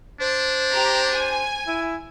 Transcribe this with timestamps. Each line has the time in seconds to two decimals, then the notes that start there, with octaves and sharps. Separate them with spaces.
0.21 D4 C5
0.72 G4 A#5
1.12 G#5
1.68 E4